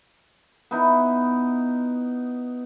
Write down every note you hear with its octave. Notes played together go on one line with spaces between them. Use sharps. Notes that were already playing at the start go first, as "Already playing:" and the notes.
B3 D#4 E4